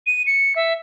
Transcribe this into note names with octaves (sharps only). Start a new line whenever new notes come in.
D#7
C#7
E5